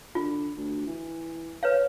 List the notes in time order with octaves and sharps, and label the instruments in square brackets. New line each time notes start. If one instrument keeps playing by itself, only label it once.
[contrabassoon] D3 [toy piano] F4
[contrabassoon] D2
E3
[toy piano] B4 C#5 F5